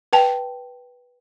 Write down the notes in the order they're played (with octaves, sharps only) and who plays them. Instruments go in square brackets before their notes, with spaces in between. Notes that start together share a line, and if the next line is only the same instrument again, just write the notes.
[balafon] B4 G5 A5